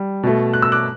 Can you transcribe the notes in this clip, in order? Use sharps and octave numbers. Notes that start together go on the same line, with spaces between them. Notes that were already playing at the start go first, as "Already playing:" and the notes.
Already playing: G3
B2 A3
F#6
E6
D6 F#6